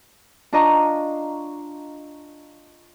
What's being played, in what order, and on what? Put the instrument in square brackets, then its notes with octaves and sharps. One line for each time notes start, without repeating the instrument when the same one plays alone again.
[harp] D4 F4 D#5 A#5 C#6